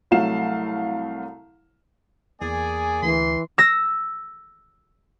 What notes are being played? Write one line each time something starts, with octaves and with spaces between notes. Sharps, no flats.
C2 F#3 A3 F5 E7
E2 A#3 G#4 D5 G#5
D2 E3 C6
E6 A#6